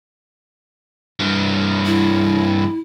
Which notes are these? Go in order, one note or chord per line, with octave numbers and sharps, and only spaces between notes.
G2 E3
E4